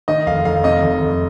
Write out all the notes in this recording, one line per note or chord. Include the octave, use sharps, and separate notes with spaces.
D#3 D#5
F1 F5
F1 F5
C3 D#5
F1
F1